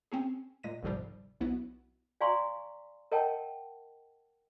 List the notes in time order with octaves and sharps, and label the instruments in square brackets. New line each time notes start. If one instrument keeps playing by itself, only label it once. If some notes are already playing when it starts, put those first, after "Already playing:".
[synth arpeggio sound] C4 C#4 G#4
A#2 G#3 A#6 D#7
G1 C2 G#2 C3 F3 G3
B1 B3 E4 F#4
[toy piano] D5 F5 G#5 A#5 C6 C#6
A#4 C#5 D#5 F#5 G5 A5